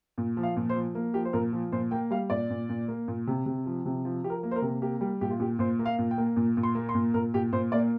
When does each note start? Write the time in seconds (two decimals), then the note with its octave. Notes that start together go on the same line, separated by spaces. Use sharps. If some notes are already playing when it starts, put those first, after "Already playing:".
0.18 A#2
0.37 F3
0.43 F5
0.56 A#2
0.69 C5
0.76 F3
0.95 A#3
1.14 F3 G4
1.25 C5
1.33 A#2 A#4
1.53 F3
1.72 A#2 C5
1.91 A#3 G5
2.11 G3 F5
2.30 A#2 D5
2.50 A#2
2.69 A#2
2.88 A#3
3.08 A#2
3.27 C3
3.46 C3
3.66 F3
3.86 C3
4.05 F3
4.23 F3 G4
4.30 A#4
4.43 A#3
4.51 C5
4.56 A#4
4.62 C3
4.82 A#3 G4
5.01 G3
5.21 A#2 G4
5.30 F4
5.39 A#2 G4
5.59 A#2 C5
5.79 A#3
5.85 F5
5.98 A#2
6.11 G5
6.18 A#3
6.36 A#2
6.57 A#2
6.63 C6
6.75 A#3
6.89 C6
6.94 A#2
7.14 A#2 A#4
7.34 A#2 G4
7.53 A#2 C5
7.72 A#3 D5